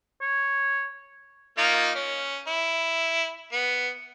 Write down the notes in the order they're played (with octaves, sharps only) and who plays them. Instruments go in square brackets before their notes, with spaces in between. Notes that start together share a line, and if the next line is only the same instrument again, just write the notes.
[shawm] C#5
[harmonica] A#3 D#4 F4
C#4
E4
B3